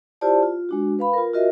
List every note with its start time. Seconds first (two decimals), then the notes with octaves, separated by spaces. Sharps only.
0.21 E4 F4 G4 C5 D5 A5
0.43 F4
0.69 G#3 D4 F#4
0.99 B4 F5 B5
1.13 F4 A#4
1.34 F4 F#4 A#4 D#5 E5